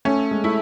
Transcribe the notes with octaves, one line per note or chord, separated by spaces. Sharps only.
A3 C#4
G#3
A3 E4